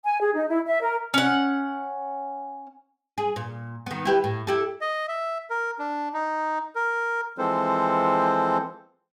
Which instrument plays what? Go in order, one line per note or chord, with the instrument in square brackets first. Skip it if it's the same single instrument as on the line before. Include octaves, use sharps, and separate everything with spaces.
[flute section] G#5
G#4
D#4
E4
E5
A#4
[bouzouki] C#4 F#5
[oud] G#4
A#2
D#3 B3
E4 G4 B4
A2
E4 G4 A4
[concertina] D#5
E5
A#4
D4
D#4
A#4
[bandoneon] E3 F3 G#3 C4 A4 C5